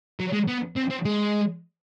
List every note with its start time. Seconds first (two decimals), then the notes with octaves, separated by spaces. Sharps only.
0.20 F#3
0.33 G#3
0.48 B3
0.77 C4
0.91 C4
1.05 G#3